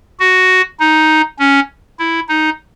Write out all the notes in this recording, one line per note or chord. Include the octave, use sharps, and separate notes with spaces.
F#4
D#4
C#4
E4
D#4